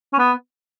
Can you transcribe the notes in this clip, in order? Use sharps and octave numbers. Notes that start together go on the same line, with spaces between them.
C#4
B3